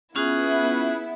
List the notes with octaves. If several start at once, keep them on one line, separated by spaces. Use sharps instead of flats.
B3 C#4 E4 F4 G#4 F#6